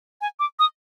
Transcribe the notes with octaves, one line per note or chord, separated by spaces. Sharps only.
G#5
D6
D#6